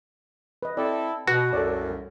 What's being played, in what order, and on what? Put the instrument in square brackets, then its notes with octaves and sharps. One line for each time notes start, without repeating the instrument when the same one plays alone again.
[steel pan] B4 D#5
[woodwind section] C4 E4 A4 [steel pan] D5
[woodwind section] B2 [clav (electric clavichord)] F#4 [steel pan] B4
[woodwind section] C2 F#2 [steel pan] A4 C#5 D5